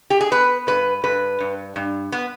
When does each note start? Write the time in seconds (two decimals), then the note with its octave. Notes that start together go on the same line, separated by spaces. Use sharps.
0.10 G4
0.21 G#4
0.31 B3 B4
0.67 G2 B4
1.04 G2 B4
1.40 G2
1.76 G2
2.12 B3